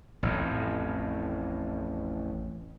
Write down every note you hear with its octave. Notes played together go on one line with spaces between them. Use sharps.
A1 F2 A2